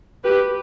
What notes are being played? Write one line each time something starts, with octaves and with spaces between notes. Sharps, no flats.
G4 B4